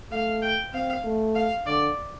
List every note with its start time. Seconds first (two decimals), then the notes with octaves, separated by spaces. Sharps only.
0.11 A3 F5
0.42 G5
0.73 C4 F5
1.04 A3
1.35 F5
1.66 D3 D5